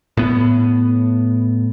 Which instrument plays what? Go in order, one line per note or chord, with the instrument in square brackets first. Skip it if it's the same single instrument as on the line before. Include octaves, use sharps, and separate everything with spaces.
[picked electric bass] A2 B3